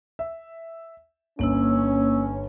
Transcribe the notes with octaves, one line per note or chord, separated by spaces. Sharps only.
E5
G1 A#3 C#4 E6 F#7